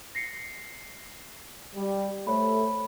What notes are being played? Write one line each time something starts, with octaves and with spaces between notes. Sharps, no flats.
A#6 C7 C#7
G3 G4
A3 C5 C#5 B5